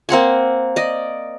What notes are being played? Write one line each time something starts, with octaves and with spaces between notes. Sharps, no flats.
A#3 C4 F#5 G#5
D5 D#5